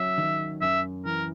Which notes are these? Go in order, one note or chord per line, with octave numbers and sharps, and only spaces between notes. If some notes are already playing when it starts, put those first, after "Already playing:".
Already playing: F#3 C#4 E5
D#3
F#2 E5
E3 A#4